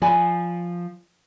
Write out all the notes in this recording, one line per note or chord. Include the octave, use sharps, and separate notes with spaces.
F3 D5 G#5 B5